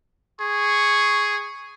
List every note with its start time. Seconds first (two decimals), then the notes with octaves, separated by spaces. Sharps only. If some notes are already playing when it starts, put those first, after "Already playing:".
0.41 G#4 C#6